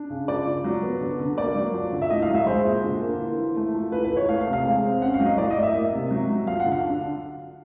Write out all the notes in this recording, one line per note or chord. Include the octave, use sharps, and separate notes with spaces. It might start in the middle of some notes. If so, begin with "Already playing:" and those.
Already playing: D4
C#3
F3 D5
F3
F#3
B3
D3
D3
A#3 D5
F#3
F3
D3
E5
A2 D#5
F5
F#3
E5
G#3 C5
A#2
D3
A#3
E3
E3
A3
F3
E3 B4
B4
E3
C#5
A3 F5
F5
C3
F5
G#3
C4
C#4 F#5
F5
F#3
D#5
A2 D5
D#5
A2
E5
A#3
C3
F#3
F#3
F3 F5
F#5
D3
F5
D4